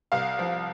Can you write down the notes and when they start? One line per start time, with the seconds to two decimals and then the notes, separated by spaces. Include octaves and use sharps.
0.12 C2 F5
0.39 F3